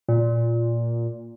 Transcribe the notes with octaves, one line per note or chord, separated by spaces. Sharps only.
A#2